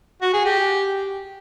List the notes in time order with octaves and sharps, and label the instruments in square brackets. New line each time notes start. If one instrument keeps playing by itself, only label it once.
[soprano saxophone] F#4
G#4
G4